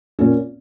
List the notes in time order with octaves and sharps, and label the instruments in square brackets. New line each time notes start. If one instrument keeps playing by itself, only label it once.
[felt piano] A#2 A#3 C#4